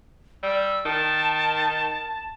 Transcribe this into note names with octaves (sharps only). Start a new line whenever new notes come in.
G3 E6
D#3 A5